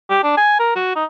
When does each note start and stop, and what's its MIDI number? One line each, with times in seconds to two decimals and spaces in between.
0.10 0.19 67
0.23 0.33 62
0.37 0.57 80
0.60 0.74 70
0.76 0.91 66
0.96 1.05 63